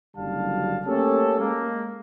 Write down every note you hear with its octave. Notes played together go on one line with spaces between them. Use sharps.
F#1 F#2 D3 G3 F5 A5
A3 A#3 C#4 G4 A4
G#3 A#3